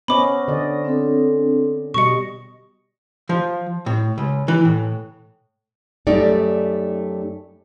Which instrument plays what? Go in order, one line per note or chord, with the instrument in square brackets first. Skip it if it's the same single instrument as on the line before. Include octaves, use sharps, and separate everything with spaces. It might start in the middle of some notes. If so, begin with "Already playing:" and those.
[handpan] B3 C#4 D#5 [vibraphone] C5 C#6 [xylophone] B5 D6
[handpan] D3 D5 D#5
[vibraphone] C4 D4 A4
[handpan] B2 G3 D#5 [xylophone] C#6 C#7
[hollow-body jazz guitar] F3
A2
C#2
E3
A2
[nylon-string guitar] F#2 G3 A3 D#4 D5